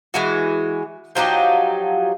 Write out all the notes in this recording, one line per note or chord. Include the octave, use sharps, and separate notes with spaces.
E3 G#3 F#4
F3 F#3 D#4 G4